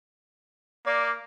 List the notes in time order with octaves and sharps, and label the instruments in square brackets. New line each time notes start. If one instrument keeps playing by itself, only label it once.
[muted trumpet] A#3 [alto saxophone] D5